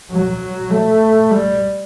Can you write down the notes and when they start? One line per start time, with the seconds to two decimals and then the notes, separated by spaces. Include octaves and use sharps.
0.11 F#3
0.71 A3
1.31 G3